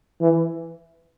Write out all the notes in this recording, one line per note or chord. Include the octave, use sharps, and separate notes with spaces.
E3